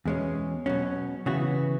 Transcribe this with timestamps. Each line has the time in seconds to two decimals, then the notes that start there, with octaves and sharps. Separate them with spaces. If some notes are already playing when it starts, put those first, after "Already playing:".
0.05 E2 B2 G#3 C#4
0.66 B2 F#3 C#4
1.26 C#3 E3 B3 F#4